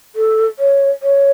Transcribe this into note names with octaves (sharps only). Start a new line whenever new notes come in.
A4
C#5
C#5